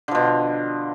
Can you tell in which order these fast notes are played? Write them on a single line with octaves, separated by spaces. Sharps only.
D3 F3 B2